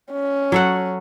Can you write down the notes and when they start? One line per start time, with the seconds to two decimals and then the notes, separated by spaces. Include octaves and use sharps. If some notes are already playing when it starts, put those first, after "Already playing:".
0.12 C#4
0.52 F#3 A4 F#5